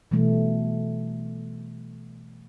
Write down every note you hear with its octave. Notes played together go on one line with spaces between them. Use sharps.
B2 E3 G3 A3